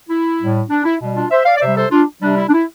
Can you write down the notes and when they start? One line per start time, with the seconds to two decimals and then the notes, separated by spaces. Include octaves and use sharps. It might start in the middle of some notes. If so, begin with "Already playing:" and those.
0.09 E4
0.40 A2 G3
0.70 D4
0.85 E4
1.00 B2 G3
1.16 D4 F4
1.31 C5 E5
1.46 D5 F5
1.57 D5
1.61 C3 G3 C5 E5
1.76 A4 C5
1.91 D4 F4
2.22 C3 G3 D4
2.37 E4
2.49 D4
2.53 E4